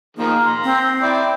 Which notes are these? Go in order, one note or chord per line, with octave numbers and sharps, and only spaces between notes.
D#3 F3 A#3 G#4
A#5 C6
C4
E4 D5